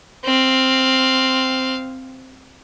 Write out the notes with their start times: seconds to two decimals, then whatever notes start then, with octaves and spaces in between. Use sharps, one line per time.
0.24 C4 F5